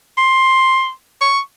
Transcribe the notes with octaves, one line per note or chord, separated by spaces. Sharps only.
C6
C#6